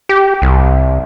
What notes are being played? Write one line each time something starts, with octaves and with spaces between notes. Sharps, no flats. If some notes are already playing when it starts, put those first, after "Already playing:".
G4
C2